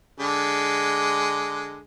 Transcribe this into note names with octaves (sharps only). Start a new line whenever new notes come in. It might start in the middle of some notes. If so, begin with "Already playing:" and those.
D3 G#3